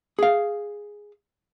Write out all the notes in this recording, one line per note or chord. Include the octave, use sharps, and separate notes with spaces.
G#4 F5